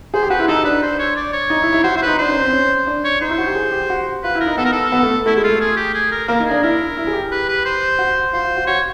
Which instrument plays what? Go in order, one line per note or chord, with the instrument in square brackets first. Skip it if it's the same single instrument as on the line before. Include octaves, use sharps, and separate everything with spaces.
[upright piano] G#4 [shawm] C5
[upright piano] G4
[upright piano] F#4 [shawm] B4
[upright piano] E4
[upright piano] D#4 [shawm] A4
[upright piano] D4 [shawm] B4
[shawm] C5
C#5
D5
C#5
[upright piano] D#4
E4
E4
[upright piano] F#4 [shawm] C5
[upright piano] E4 [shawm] C5
[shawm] B4
[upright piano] D#4
[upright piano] D4 [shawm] C5
[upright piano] C#4
C4
C#4
D4
[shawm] C#5
[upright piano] D#4 [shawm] C5
[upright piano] E4
F#4
G4
G#4
G4
F#4
[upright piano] F4 [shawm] B4
[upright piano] E4
[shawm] A#4
[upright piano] D#4
[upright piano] B3 [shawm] A4
[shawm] A#4
A4
[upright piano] B3
A3
[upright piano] A3 [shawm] E4
[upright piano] G#3 [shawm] E4
[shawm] F4
[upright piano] A3
[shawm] G#4
G4
G#4
A#4
[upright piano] A#3 [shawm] A#4
[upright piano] D#4
[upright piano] D4 [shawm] G#4
[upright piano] E4 [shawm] A#4
[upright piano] E4
G#4
G4
[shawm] B4
B4
C5
[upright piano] F#4
[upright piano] F4 [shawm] C5
[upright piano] F4
F#4
[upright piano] F#4 [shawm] C#5